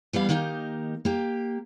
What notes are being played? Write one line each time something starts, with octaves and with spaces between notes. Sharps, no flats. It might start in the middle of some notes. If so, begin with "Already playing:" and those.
E3 G3 B3 F5
D#3 A#3 D#4 G4 A#4
A#3 G4